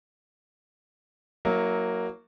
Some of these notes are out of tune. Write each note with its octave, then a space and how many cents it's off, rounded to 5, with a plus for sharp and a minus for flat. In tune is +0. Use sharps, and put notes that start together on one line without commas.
F#3 +0 A#3 +0 E4 -35